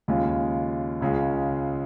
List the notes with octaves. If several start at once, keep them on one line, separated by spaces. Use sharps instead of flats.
D#2 C#3 G#3 F4
C#2 C#3 G#3 F4